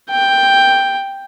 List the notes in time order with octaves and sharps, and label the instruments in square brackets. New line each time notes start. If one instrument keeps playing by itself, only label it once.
[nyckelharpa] G5